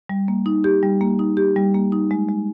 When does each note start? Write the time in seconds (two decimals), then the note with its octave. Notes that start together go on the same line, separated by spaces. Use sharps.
0.09 G3
0.28 A#3
0.46 D#4
0.64 G4
0.83 G3
1.01 A#3
1.19 D#4
1.37 G4
1.56 G3
1.74 A#3
1.92 D#4
2.11 G#3
2.29 G#3